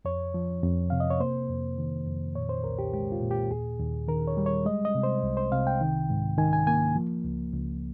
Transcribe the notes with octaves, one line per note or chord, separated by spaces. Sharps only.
F2 C#5
F3
F2
C3 F5
D#5
C#5
A#3 C5
F2
D#3
F2
A#2 C#5
C5
C2 A#4
G4
G#3 G4
F4
A#2
G4
D#2 G#4
D#2
D#3 A#4
C#5
G3
C#5
G#3 D#5
D#5
C3
C5
C2
C5
C3 F5
G5
D#3
G#2
D#3 G#5
G#5
A#3 G#5
F3
C#2
C#2